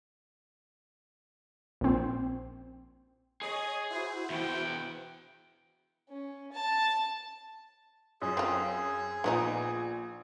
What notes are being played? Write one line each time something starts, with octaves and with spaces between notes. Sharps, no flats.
A#1 C4
G#4 C#5 D#5 D#6
E4 F#4 C5
E2 G5
C#4
A5
F#2 G#4
C4 F4
A#1 D#3 B3 D#4 G#5